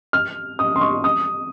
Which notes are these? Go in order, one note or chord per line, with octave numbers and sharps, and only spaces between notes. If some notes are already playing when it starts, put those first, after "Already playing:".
F6
D#6
C6
C#6
D#6